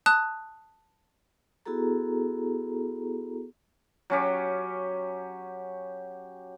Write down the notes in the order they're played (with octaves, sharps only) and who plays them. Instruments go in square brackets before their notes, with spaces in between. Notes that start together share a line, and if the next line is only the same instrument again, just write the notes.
[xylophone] A5 D#6 F#6
[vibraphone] B3 E4 F#4 G#4 A4 A#5
[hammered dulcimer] F#3 C#4 G4